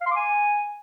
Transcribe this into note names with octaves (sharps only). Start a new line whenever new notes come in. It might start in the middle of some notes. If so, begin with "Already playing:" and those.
F5
C6
D6
G#5